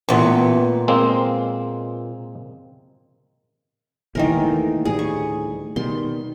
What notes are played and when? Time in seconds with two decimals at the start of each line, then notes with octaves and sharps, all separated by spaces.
0.09 A1 A#2 B3
0.88 G#3 A#3 C4
4.15 E1 D#2 A2 D#3 E3 A#4
4.44 A3 A#3
4.85 D2 A2 G3 G#4
4.99 C#6
5.76 B2 D#3 G3 C6